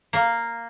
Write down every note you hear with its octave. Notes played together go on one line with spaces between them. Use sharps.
A#3